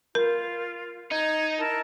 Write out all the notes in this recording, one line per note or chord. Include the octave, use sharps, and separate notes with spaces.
F4 A#4
D#4 G#6
E4 A#4 A5